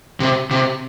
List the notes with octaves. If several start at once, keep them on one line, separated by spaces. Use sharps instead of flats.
C3
C3